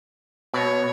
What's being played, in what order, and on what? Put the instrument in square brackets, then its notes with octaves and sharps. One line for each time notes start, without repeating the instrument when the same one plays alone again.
[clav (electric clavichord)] B2 [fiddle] C#5